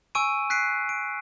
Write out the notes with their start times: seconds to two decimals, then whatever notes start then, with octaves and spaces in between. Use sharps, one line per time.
0.15 G#5 C#6 E6 D7 D#7
0.50 F#6 B6 C7 D7
0.89 D7